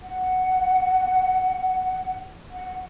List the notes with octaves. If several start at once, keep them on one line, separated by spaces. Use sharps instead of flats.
F#5
F#5